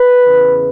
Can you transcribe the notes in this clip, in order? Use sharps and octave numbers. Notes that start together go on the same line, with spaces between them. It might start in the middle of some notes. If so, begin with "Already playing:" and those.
Already playing: B4
E2 C#3 E3